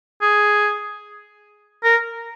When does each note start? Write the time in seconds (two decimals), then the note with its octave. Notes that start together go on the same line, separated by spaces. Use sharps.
0.22 G#4
1.84 A#4